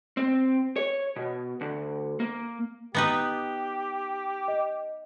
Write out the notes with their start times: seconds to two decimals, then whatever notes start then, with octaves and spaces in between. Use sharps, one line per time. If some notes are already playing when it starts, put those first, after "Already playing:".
0.17 C4
0.76 C#5
1.16 B2
1.61 D2
2.20 A#3
2.95 B3 D#4 G4 B4
4.48 D#5